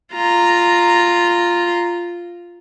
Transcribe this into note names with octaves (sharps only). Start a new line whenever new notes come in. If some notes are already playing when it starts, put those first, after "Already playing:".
F4 A#5